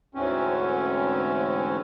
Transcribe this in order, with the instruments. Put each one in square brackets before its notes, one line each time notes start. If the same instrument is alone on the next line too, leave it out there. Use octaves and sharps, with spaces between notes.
[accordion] D2 G#2 D3 E3 C4 C#4